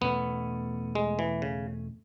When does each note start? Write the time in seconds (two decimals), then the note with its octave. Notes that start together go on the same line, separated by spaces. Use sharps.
0.01 E2 B2 A3 B3 C#4
0.95 G#3
1.19 E3
1.42 C#3